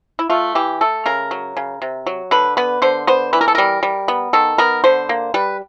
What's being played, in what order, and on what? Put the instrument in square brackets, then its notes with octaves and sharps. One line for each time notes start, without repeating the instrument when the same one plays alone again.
[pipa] E4
A3 F4
E3 G4
A3 A4
C#3 A#4
F#3
C#3
C3
F#3
D3 B4
B3 B4
D3 C5
B3 C5
E3 B4
A#4
A4
G3 A#4
G3
B3
D#3 A4
B3 A#4
D3 C5
A#3
G3 B4